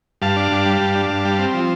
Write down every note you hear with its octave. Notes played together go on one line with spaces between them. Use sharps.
G2 F5 A5
D4
G2
G3
G2
D4
G2
G3
C4
F3